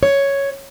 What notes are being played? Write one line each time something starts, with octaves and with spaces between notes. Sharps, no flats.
C#5